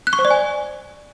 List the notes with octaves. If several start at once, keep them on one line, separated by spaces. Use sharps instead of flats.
F#6
C#6
C5
D5
G#5